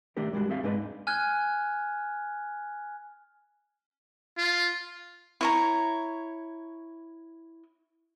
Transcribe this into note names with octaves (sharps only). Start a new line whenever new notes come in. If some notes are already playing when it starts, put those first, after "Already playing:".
D#3 A3 D4 G4 A#4
G3 G#3 D4 F#4
C4 G#4 E5 F5
G#2 G#3 D4 D#4 B4 D#5
G#5 F6 F#6 G#6
F4
E4 C#5 A#5